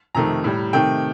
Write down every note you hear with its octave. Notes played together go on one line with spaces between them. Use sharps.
F2 C3 D#3 A3 A#5
A2 G3
C3 D#3 A3 G5